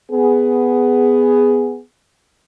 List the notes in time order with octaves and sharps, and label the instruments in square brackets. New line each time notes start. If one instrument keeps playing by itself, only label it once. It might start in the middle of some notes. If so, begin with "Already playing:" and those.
[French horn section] B3 G#4